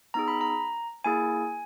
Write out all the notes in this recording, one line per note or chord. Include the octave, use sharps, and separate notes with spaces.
B3 D#4 G#4 A#5
B5
A#5
A#3 E4 G#4 G#5